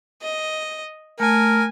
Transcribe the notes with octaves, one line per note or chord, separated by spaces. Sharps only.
D#5
A3 A#4 G#5 A5